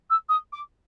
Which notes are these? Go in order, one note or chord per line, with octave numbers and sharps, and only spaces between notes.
E6
D#6
D6